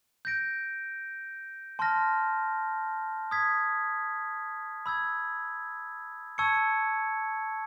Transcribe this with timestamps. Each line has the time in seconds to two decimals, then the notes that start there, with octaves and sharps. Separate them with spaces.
0.25 G6 A#6 D7
1.79 A5 C6 F6 A#6
3.31 D#6 G#6 B6
4.86 B5 E6 G#6
6.38 A5 C#6 E6 G#6 C#7